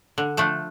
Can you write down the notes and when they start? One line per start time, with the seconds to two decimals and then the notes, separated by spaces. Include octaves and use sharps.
0.18 D3
0.37 F3 A3 D4 A4